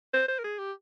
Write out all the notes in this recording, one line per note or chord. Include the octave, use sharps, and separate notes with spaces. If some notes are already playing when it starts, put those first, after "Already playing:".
C5
C5
A#4
G#4
G4